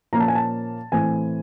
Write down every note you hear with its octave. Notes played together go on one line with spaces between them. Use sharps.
A#2 F3 A#3 C#4 A#5
A5
G#5
A5
A2 E3 A3 C4 G#5